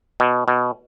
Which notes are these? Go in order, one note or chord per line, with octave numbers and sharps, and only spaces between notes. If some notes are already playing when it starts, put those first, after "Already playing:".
B2
B2